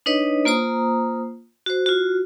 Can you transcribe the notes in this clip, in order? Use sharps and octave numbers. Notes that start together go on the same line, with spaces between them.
D4 D#4 B4 C#5 D#5
A#3 F4 C5 A#5 D#6
F#4 C5
F4 F#4